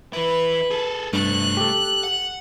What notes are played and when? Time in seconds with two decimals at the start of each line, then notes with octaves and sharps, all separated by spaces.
0.13 E3 E4 B4
0.70 G#4 A4
1.13 G2 C3 A3 F#6
1.57 G4 A4
2.04 F#5